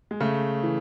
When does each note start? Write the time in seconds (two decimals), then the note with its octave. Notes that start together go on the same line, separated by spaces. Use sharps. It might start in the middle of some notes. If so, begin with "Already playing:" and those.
0.11 G#3
0.20 C#3 A3
0.63 E3